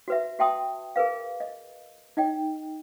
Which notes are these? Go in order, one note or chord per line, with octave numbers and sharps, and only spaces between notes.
F#4 B4 E5
F#4 E5 G5 A5 C6 D#6
G#4 A#4 B4 F5
D#5
D#4 D#5 G5